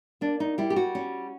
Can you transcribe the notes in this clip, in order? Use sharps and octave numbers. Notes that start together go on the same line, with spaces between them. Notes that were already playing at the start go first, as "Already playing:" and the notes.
A#3 D4
D#4
G3 E4
G4
F#4
C#4